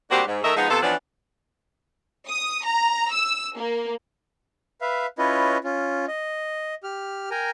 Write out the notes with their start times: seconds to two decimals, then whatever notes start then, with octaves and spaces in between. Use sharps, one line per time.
0.11 G3 A#3 C4 D4 F#4 G4
0.27 G#2
0.43 D#3 A3 A#4 D#5 E5
0.56 F3 G#3 B3 D#4
0.70 C3 B3 F4 A4
0.82 E3 F3 B3 C#4 D4
2.29 D#6
2.65 A#5
3.14 E6
3.59 A#3
4.81 B4 E5 F5
5.19 C#4 E4 F4 B4 C#5 D#5
5.64 C#4 F4
6.08 D#5
6.83 G4 F6
7.31 A#4 G5 G#5 A#5